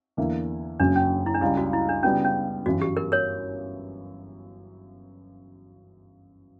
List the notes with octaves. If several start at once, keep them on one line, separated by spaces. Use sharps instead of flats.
E2 D3 A#3 E4
F#1 F#2 C#3 F#3 D4
C#4
E4
D4
C#2 C#3 G3 E4
F#4
E4
D4
C#3 G3 B3 C#4 F#4
C#4
G1 F#2 E3 F#4
G4
A#4
A#4 C#5